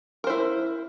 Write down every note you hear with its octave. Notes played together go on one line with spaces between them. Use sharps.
E4 A#4 C5